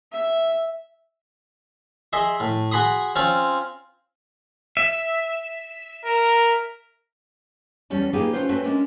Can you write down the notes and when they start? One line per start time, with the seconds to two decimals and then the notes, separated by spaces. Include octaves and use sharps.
0.12 E5
2.13 G#4 D#5 E5 C6
2.40 A2
2.72 F#4 G#4 B5 C6 D#6
3.16 C4 C#4 F4 C#5
4.77 E5
6.06 A#4
7.90 E2 G3 C#4 A5
8.13 A#3 D#4 F4 G4 G#4 B4
8.33 A3 C#4 F4 B4 C5
8.49 A3 C4 C#4 F#4 B4
8.64 G#3 C#4 D4 A#4